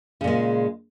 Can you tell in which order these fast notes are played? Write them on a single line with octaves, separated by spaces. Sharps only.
C#3 A#2 G#3